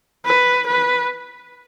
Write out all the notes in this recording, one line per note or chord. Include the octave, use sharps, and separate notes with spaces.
B4
B4